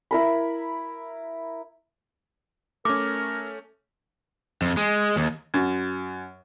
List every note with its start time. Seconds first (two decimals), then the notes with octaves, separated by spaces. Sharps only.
0.11 E4 A#4 B5
2.85 A3 C#4 A#4 D6
4.62 F2
4.77 G#3
5.16 D#2
5.54 F#2